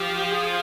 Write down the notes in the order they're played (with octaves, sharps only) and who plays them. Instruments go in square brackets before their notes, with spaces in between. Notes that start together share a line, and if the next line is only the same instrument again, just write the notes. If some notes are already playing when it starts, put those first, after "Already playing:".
Already playing: [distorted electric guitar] F3 [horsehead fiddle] G4
[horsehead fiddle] G#4